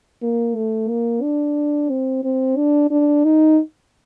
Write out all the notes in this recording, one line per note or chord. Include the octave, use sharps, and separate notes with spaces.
A#3
A3
A#3
D4
C4
C4
D4
D4
D#4